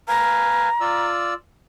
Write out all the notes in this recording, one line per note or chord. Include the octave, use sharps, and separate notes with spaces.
B4 F5 G#5 A#5
F4 D5 E6